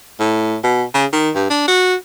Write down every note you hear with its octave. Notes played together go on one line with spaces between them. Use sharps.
A2
B2
C#3
D#3
G2
D4
F#4